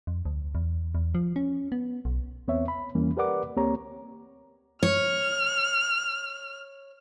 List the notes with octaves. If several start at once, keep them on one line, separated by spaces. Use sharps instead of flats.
F2
D2
E2
E2
F3
C#4
B3
B1
E2 B3 C4 C#5 E5
B5
E2 E3 G3 A#3 C#4
G4 A#4 B4 D5 F#5 D6
D2 A#3 C4 G4 C#5 A#5
C#5 F6